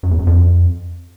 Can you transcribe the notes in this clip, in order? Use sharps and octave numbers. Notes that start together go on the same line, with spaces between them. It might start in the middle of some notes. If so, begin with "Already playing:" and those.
F#2
E2
F#2
F2